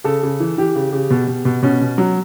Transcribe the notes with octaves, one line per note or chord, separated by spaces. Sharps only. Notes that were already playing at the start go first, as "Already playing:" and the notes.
C#3 A4
C#3
E3
E3 G4
C#3
C#3
B2
B2
B2
B2 C#4
B2
F#3